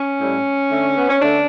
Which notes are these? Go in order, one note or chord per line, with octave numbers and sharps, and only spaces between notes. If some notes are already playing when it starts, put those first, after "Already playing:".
Already playing: C#4
A2 G3
D3 A3
B3
C#4
D3 A3 D4